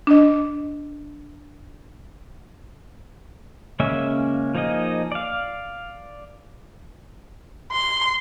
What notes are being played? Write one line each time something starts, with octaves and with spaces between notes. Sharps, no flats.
D4 D#5
C#3 G#3 A#3 C#4 E5
F3 A#3 D#4 G#4 D#5
D5 F5
C6